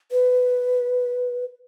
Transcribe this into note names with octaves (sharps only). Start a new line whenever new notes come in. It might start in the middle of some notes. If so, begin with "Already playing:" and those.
B4